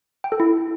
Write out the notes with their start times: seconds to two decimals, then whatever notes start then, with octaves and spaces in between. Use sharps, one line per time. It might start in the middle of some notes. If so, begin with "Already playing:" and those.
0.24 G5
0.32 A4
0.40 E4